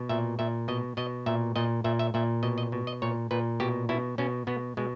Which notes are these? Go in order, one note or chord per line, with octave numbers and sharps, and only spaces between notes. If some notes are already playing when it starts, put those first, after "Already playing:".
Already playing: B2
A#2 E5
A#2 E5
B2 D#5
B2 D#5
A#2 E5
A#2 D#5
A#2 E5
E5
A#2 E5
B2 D#5
D#5
B2
D#5
A#2 C#5
A#2 B4
B2 G4
B2 E4
B2 C#4
B2 B3
B2 G#3